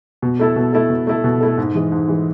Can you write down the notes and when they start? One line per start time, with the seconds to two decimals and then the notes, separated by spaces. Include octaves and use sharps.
0.22 B2
0.40 A3 E4 A4
0.56 B2
0.73 A3 E4 A4
0.90 B2
1.07 A3 E4 A4
1.24 B2
1.41 A3 E4 A4
1.58 G#2
1.75 E3 G#3
1.92 G#2
2.08 E3 G#3